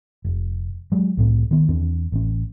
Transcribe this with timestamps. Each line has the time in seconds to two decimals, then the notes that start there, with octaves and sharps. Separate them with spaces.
0.25 F1
0.92 F#3 G#3
1.17 C2 A2 C4
1.51 D#3 B3
1.68 E2 C4 D4
2.12 A1 C#4